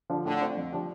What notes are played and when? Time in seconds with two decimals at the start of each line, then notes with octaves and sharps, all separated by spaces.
0.10 D3 F3 D4 F4
0.25 A2 D3
0.41 A3 C4 F4
0.57 F2
0.72 F3 D4 G4